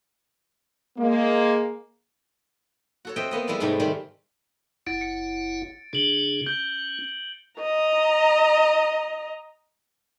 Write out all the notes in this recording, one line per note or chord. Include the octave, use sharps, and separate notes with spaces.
G#3 A#3
F#4 A4 C#5
C4 D#5 E5 G5
A#3 B3 D#5
G3 G#3 E4 A4 D5
G#2 C3 G3 A3 D#4
D#3 G3 G#3 C4
F#1 E4 F#5 A6 D7
C#7
C#3 D4 G#4 D7 F#7 G7
C#4 G6 G7
D#5 A#5